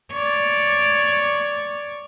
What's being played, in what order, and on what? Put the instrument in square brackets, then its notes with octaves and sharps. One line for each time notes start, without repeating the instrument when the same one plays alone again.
[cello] C#5 D5